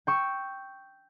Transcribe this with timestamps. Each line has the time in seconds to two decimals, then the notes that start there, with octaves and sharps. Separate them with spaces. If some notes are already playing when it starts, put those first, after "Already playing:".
0.07 G5 C#6 E6